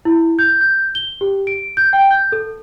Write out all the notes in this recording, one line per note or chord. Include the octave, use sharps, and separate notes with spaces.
E4
G6
G6
G7
G4
D7
G6
G5
G6
A4